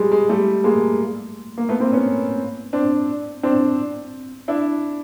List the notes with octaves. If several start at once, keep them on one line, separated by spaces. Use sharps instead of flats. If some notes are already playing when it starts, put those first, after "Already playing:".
Already playing: G3 G#3
G#3
G3 A3
G#3 A#3
A#3
A3 B3
A#3 C4
B3 C#4
C4 D4
C4 D4
D4 E4